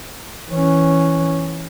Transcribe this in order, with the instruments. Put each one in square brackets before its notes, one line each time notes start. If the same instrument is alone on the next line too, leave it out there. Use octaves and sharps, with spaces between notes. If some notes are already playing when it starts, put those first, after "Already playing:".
[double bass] E3 C#4